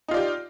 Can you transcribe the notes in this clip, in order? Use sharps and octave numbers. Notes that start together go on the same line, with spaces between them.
D#4 F4 G4 D5